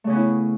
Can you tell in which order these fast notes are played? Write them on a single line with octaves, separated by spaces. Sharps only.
A3 C#3 C#4 B3 E4